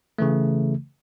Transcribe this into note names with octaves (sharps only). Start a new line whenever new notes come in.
C#3 E3 A3